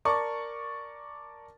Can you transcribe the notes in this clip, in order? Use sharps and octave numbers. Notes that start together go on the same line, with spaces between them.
A#4 D5 A5 C#6 D6